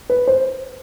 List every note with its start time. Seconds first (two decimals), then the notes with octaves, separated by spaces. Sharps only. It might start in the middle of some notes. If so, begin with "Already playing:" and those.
0.10 B4
0.28 C5